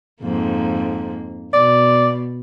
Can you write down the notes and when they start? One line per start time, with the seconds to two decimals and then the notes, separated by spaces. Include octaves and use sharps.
0.22 F2 G#2 A#3
1.53 B2 D5